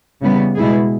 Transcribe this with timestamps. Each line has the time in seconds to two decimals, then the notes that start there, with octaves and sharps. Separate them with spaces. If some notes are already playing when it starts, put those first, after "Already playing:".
0.22 C#3 E3 G3 B3
0.56 B2 G#3 B3 E4 G#4